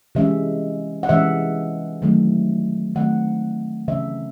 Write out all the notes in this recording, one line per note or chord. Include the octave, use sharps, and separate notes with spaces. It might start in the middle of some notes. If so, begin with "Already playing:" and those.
C3 E3 G#3 C#4 E5
F#5
C3 E3 G#3 C#4 E5
D#3 F#3 A3 C4
D#3 F#3 A3 C4 F#5
C#3 E3 C4 E5